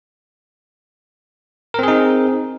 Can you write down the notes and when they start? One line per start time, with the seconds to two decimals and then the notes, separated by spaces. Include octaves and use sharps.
1.74 A#4
1.79 C4
1.83 G#4
1.88 D#4